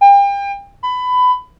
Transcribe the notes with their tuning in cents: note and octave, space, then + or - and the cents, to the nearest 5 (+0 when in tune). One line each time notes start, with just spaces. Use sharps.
G5 +35
B5 +20